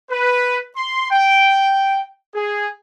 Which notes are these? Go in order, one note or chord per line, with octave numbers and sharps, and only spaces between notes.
B4
C6
G5
G#4